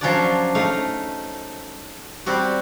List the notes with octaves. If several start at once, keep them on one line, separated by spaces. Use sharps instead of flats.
F3 F#3 C#4 D4 F#4 D5
A3 D#4 F5
G3 C4 F#4 G4